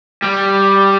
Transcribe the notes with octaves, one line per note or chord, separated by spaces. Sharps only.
G3